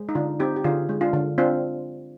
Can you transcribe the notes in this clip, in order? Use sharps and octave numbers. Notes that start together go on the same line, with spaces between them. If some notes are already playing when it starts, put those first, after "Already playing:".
Already playing: G#3
D#4
D3 D4 F4
C4 D#4 G4
G4
D3 F4 G#4
G#3
D4 F4
D3
C4 D4 F4